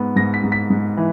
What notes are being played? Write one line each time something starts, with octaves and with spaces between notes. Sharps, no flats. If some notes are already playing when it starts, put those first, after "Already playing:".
Already playing: G#2 B3
G#2 A#6
B6
G#2
B6
G#2
E3